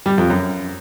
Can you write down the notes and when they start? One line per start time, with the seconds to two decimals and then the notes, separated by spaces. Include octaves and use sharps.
0.06 G3
0.18 F2
0.30 F#2